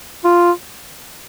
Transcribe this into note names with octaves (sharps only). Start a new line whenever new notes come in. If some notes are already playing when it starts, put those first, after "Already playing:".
F4